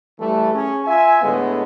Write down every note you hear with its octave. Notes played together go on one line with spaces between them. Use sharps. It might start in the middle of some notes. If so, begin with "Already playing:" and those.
E3 G3 A3
C#4 G#4
F4 E5 G#5
A2 D3 G#3 B3